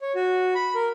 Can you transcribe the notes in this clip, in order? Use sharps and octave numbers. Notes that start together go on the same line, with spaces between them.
C#5
F#4
B5
A#4